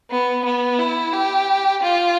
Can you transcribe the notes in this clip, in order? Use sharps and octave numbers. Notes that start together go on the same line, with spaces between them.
B3
B3
E4
G4
F4